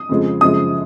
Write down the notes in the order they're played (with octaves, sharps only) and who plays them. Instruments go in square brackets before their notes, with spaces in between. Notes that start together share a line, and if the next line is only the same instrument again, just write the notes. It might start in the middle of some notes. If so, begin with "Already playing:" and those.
Already playing: [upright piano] D#6
F2 C#3 F3 G#3
F#2 C#3 F3 G#3 D#6